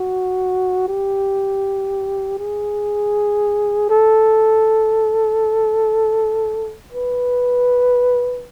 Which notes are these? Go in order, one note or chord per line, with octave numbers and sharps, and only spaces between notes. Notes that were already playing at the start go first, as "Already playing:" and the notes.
Already playing: F#4
G4
G#4
A4
B4